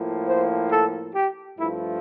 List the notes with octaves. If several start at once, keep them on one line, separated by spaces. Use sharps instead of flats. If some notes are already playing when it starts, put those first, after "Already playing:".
Already playing: A2 F3 A#3
C5
A4
G4
G2 F3 A3 E4